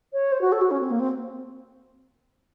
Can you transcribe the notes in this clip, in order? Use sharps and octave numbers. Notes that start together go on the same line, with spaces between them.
C#5
C5
F#4
A4
F#4
C#4
C4
A#3
C4